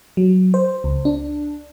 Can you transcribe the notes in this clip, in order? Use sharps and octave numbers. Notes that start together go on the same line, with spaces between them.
F#3
C5
C#2
D4